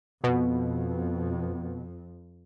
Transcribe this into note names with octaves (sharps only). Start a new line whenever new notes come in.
F2 B2